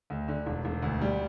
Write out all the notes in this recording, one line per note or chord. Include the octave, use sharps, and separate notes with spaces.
D2
D3
E1
E1
D2
G3